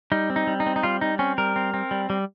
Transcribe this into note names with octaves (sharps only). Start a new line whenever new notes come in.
G3 D#4
C4
D#4
G3
D#4
C4
D#4
G3 F4
G3 D#4
C4 C#4
G3 A#4
C4
C4
G3
G3